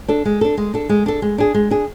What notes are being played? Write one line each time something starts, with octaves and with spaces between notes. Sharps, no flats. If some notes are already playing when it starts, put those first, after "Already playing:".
D4 A4
G#3
D4 A4
G#3
D4 A4
G#3
D4 A4
G#3
D4 G#4
G#3
D4 G#4